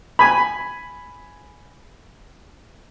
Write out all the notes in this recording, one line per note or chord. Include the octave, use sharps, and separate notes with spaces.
G#5 B5